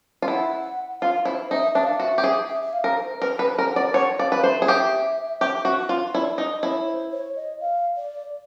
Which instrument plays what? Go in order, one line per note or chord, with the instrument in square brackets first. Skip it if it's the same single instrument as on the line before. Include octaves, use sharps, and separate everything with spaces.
[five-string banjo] F4
[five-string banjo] E4 [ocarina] F#5
[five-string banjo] F4 [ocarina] F5
[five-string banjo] E4 [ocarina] C5
[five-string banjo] D#4 [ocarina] E5
[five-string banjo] D4 [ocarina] E5
[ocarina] F5
E5
[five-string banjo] F#4
G4
G#4
[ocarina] E5
E5
F5
[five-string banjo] A#4
[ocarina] C5
[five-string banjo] A#4 [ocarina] B4
[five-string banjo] B4
[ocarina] C5
[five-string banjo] A#4
[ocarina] F#5
[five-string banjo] D5
[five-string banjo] C#5 [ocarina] F#5
[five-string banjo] D5 [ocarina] F5
[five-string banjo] B4
[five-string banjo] C5 [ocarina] E5
[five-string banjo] G#4
[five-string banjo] G4 [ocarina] E5 F5
[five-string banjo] G4
F#4
F4
[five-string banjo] E4 [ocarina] D5
[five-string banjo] D#4 [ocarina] D#5
[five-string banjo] E4 [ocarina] C#5
[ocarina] C5
C#5
D#5
F5
D5